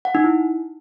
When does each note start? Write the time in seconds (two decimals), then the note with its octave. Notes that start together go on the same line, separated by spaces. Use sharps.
0.05 F#5
0.15 D#4
0.24 E4